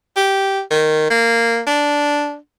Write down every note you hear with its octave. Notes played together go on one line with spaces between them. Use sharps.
G4
D#3
A#3
D4